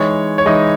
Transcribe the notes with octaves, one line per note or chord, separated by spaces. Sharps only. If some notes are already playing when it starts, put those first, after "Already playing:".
Already playing: E3 G#3 D#4 C#5
C#5
E3 G#3 D#4 D#5